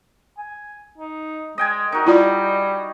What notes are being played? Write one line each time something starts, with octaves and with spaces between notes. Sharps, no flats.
G#5
D#4
G#3 D#5 G5 G#5
D#4 F#4 A#4
G3 E4 F4 D5